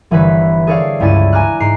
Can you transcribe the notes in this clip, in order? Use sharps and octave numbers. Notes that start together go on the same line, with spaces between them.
G1 E3 E4 B4 C#5 B6
G#4 A4 C#5 D5 F5
C#2 G2 C#4 E4 A6 D#7
G#5 A#5 D6 F6 F#6
G#2 A#5 C7 D7